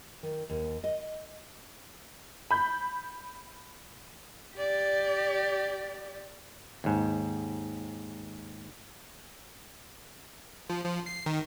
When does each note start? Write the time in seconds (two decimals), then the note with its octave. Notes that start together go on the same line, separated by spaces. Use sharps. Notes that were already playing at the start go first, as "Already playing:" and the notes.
0.23 D#3
0.49 D#2
0.84 D#5
2.51 B5 G6
4.56 G4 D5
6.84 D#2 G#2
10.70 F3
10.85 F3
11.06 C7
11.26 D#3